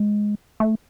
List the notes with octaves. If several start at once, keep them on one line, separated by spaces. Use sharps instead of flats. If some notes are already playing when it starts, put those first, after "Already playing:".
Already playing: G#3
A3